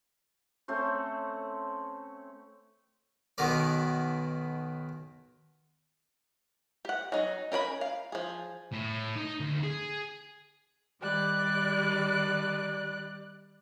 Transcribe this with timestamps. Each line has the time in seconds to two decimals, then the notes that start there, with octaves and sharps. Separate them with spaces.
0.68 A3 C4 C#4 C5
3.38 B1 B2 D#3 B3 A#4 D5
6.85 G4 F#5
7.12 F#3 D#4
7.52 C#4 A#4 F5 B5
7.81 F5
8.12 F3 G#4
8.72 A2
9.16 D#4
9.40 D2
9.63 G#4
11.01 D#3 G3 D5 F#6